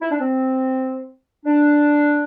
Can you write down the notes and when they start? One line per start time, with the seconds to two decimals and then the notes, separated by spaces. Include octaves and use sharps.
0.01 E4
0.10 D4
0.20 C4
1.46 D4